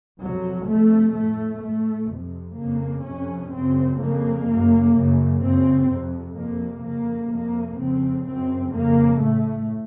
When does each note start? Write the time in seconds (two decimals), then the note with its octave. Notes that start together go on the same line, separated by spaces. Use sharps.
0.20 F2 C3 F#3
0.67 F2 C3 A3
1.14 A2 A3
1.62 A2 A3
2.09 F2 C3
2.56 F2 C#3 A#3
3.04 F2 C3 C#4
3.51 F#2 C#3 C4
3.99 F2 C#3 A#3
4.46 F#2 C#3
4.94 F#2 C#3
5.41 F#2 C#3 C4
5.88 F2 C3
6.35 F2 C3 A#3
6.82 F2 C#3 A#3
7.30 F2 C3 A#3
7.77 F2 C#3 C4
8.25 F#2 C#3 C4
8.72 F2 C#3 A#3
9.19 A2 A3